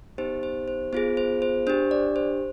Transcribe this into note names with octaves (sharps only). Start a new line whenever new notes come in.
B3 D#4 G4 C5
C5
C5
B3 F4 G#4 C5
C5
C5
D4 G4 C5
D5
C5